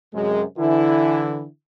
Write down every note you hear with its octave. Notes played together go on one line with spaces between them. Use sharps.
F#2 C3 G#3
D3 E3 E4